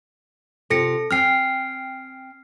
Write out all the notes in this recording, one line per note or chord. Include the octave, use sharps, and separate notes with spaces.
C3 F4 A4 A#6 C#7
C4 G5 G#5 F6 C7